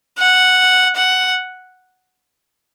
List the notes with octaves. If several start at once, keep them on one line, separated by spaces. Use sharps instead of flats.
F#5
F#5